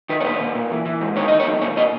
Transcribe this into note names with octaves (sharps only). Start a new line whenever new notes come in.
D#3 B4
C#5
A#2 B4
A#2
A#2
E3
E3
G#2
D#3 C#5
D#3 D#5
C#5
F#2
A#2 C#5
A#2 D#5